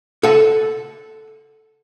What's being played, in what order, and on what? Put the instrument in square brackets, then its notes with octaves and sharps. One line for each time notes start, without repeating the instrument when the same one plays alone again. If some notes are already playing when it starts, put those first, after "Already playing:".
[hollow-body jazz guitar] A4 F#5